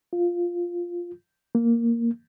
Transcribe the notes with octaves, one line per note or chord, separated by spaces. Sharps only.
F4
A#3